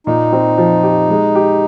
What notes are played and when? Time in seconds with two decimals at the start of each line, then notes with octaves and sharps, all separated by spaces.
0.07 A#2 D#4
0.33 C4
0.58 F3
0.83 G4
1.10 G#3
1.35 G4